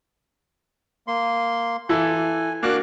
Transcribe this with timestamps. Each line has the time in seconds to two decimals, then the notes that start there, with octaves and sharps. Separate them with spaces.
1.07 A#3 C6
1.89 E3 E4 A4 G#5
2.63 A#3 D4 F#4 D6 F6 F#6